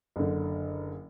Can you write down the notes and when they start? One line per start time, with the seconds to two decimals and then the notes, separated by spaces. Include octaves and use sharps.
0.16 F#1 D3